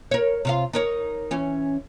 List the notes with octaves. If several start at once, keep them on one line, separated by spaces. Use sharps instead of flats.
A#4 C#5
C3 F4 F5
D#4 A#4 C#5
E3 C#4